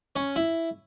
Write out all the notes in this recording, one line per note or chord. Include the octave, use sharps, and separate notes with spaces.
C#4
E4